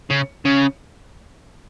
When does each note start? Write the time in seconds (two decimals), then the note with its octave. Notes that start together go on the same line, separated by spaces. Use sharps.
0.11 C#3
0.45 C#3